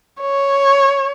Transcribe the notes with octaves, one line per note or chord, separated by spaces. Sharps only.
C#5